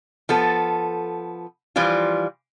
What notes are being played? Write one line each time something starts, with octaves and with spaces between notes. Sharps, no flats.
F3 B3 A4
E3 F3 G3 F4